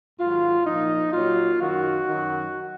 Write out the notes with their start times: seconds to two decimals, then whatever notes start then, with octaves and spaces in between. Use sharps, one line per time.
0.19 G#2 D#3 F#3 F4
0.66 A#2 F3 D#4
1.13 A#2 F#3 F4
1.60 F#2 D#3 F#3 F#4
2.07 F#2 D#3 F#3